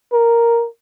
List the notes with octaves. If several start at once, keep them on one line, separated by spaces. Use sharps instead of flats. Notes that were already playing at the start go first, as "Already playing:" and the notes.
A#4